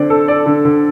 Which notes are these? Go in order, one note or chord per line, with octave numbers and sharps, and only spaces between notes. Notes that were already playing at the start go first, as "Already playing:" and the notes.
Already playing: D3 C4 D5
A4
D5
D3
D3